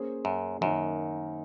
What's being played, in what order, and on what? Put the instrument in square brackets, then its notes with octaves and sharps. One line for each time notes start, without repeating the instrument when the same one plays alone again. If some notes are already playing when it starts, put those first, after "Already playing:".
Already playing: [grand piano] A#3 C#4 G#4 C5
[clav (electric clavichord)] F#2
[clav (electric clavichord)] F#2 [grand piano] D#3 A#3 D#4